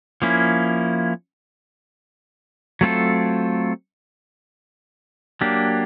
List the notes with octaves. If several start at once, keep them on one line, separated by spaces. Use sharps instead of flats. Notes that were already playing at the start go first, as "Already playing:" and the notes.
F3 A#3 C#4 E4
F#3 A3 C4 F4 A4
F#3 A#3 D4 G4